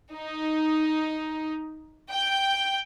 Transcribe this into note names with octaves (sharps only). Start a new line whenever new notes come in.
D#4
G5